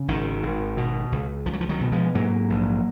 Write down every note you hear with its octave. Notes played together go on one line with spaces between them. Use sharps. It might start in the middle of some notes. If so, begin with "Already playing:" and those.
Already playing: C#3
G#1 D#3
G#1
B2
C#2
C#2 F3
F#3
F3
D#3 F#3
B2
F3 G#3
G#2 F#3 A#3
A#1